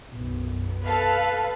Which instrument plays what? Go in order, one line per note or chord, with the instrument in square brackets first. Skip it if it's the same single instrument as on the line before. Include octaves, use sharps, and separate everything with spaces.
[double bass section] B1 F#2 B3
[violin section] A4 F5 [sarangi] B4